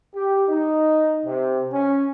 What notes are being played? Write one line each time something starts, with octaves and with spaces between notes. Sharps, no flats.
G4
D#4
C3
C#4